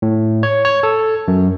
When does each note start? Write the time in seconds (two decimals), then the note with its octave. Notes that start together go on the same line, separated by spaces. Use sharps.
0.02 A2
0.43 C#5
0.65 C#5
0.83 A4
1.28 F#2